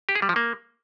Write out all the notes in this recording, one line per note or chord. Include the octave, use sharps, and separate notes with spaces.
G4
G#4
G3
F3
A#3